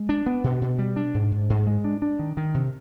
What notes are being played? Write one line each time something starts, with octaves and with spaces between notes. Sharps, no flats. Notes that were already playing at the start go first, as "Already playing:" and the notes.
Already playing: G#3
D4
B3
B2
B2
G3
D4
G#2
G#2
G#2
G#3
D4
D4
D#3
D#3
C3